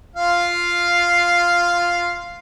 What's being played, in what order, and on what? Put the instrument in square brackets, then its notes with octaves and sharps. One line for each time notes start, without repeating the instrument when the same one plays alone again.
[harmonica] F4 F5